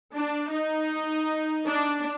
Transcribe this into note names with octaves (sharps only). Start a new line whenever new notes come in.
D4
D#4
D4